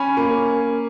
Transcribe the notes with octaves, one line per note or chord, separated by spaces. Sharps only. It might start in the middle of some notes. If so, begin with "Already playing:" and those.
Already playing: C#4 G#5 B5
A#3